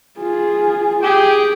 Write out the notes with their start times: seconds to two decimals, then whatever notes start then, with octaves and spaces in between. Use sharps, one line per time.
0.20 F4 G#4
1.03 G4 G#4 G5